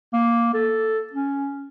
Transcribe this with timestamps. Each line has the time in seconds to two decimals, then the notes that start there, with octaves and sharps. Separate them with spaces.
0.13 A#3
0.54 A4
1.13 C#4